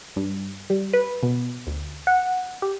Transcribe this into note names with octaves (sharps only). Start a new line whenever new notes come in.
G2
G3
B4
B2
D2
F#5
G4